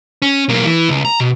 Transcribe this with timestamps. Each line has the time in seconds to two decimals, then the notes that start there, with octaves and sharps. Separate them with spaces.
0.22 C#4
0.49 B1 A#3
0.65 E3
0.89 C#2
1.05 A#5
1.20 B2